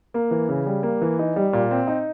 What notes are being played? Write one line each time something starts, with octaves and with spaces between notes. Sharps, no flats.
A#3
E3
C#3
G3
A#3
E3
D#4
G3
A#2
C4
D#4